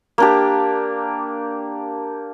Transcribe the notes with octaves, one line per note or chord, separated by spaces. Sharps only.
A#3 D4 G4